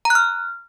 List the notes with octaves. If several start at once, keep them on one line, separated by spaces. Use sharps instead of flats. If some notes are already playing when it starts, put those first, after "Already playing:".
A#5
F#6
F6